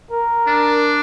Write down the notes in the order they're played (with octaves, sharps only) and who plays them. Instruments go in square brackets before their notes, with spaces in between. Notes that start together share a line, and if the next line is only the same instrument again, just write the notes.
[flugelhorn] A#4
[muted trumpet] D4